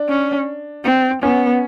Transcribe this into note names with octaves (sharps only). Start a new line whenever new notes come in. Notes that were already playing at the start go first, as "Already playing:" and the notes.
Already playing: D4
C#4
C4
B3 C#4